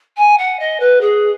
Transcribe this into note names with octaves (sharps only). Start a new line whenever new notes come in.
G#5
F#5
D#5
B4
G#4